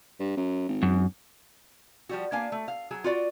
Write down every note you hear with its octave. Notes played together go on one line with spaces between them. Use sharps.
G2
F#2
G#1
F#2
F3 G3 F#4
A#3 B3 D4 F5 G#5
A3
F5
F#3 G#4
F4 F#4 D5